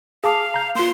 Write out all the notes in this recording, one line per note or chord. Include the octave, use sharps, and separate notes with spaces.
G#4 F5 A5 D6
A#5 G6
A#3 F4 C6